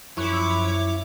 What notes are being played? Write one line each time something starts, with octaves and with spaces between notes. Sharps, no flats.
F#2 F3 E4 C#5 C#6 D6 F#6